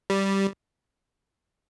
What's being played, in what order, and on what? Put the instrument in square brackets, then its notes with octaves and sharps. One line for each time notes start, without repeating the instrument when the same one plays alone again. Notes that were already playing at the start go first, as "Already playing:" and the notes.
[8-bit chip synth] G3